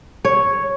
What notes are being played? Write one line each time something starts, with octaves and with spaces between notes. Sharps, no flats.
C#5